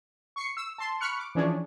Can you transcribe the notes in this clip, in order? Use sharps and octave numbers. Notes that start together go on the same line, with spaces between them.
C#6 C7 C#7
E6
A5 C6
B5 C#6 F6 F#6 C#7
D6
E3 F3 C#4 D4 G#4 C#5